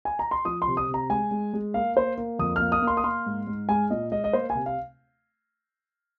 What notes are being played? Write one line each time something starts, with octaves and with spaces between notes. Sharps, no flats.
G#5
A#5
C6
F3 D#6
C6
C3
D#6
C3
A#5
G#3 G#5
G#3
G#3
A#3 F5
A#3 C5
A#3
F2 D#6
A#3 F6
D#6
A#3
C6
D#6
A#3 C6
G#2
G#2
G#3 G#5
A#2 D#5
G#3 D#5
D#5
A#3 C5
G#5
C3
F5